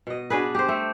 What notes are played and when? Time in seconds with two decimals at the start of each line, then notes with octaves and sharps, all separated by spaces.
0.07 B2 D#5
0.30 D4 F#4 G#4 B4
0.55 G4 C5
0.68 A3